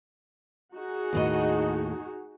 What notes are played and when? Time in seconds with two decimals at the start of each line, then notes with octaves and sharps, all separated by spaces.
0.75 D#4 F#4 G#4
1.13 D#2 A2 D#5